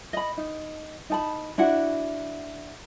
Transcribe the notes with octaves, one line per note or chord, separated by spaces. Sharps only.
D#5 B5
D#4
D#4 A5 B5
D4 E4 F#4 F#5